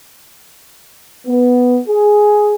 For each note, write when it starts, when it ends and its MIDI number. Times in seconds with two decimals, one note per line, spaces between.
1.27 1.79 59
1.88 2.53 68